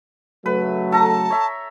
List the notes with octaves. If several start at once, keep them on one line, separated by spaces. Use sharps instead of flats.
C#3 F#3 A3 B4
A4 A5 A#5
C#5 E5